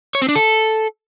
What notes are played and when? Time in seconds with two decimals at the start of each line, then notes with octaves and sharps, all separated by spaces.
0.15 C#5
0.22 C4
0.29 D4
0.35 A4